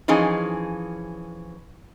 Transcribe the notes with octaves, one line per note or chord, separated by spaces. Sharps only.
E3 F3 C#4 D#4 G#4